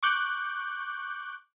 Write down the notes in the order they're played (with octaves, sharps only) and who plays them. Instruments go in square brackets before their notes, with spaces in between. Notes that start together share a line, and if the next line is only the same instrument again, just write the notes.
[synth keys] C#6 D6 F#6 G6